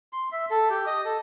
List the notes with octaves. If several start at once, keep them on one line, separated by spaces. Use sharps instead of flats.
C6
E5
A4
G4
D#5
A4